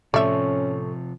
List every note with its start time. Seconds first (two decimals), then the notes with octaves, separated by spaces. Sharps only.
0.14 A2 C3 F3 C#4 A4 D5 E5 C#6